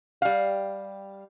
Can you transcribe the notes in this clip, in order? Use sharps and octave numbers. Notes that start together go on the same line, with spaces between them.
G3 F5